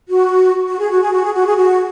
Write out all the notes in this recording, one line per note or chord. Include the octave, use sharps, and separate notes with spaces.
F#4
F#4
G#4
F#4
G#4
F#4
G#4
F#4
G#4
F#4